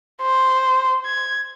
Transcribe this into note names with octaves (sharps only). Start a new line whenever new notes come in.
C5
G#6